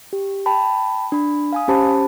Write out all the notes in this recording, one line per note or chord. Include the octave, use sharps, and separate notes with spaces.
G4
G5 A5 B5
D4 B5
F5 G#5 D#6
C#4 G4 C5 A5 B5